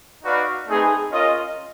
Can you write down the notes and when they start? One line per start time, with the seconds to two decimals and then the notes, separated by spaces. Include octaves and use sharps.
0.23 D#4 F#4 B4 D5 F5
0.67 A3 C4 D#4 G#4 B4
1.12 C#4 F4 A#4 D#5